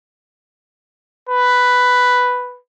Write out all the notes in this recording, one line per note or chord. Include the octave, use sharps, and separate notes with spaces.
B4